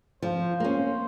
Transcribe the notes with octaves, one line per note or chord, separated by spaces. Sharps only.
F3 C5
A#3 C#4